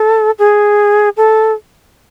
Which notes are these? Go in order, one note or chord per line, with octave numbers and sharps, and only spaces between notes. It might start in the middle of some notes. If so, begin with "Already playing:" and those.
Already playing: A4
G#4
A4